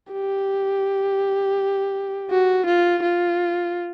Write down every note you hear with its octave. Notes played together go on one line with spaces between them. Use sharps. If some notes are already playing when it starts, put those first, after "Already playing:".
G4
F#4
F4
F4